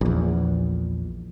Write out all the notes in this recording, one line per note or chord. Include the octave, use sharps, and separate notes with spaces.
A#1 E2